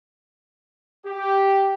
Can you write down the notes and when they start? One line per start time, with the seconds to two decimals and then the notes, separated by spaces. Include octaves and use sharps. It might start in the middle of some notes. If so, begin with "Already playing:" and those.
1.05 G4